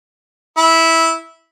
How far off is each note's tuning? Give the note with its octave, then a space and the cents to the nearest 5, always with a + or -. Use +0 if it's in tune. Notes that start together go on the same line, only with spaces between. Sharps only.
E4 -10